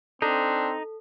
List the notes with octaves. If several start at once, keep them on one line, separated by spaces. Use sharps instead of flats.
C4 D4 D#4 A4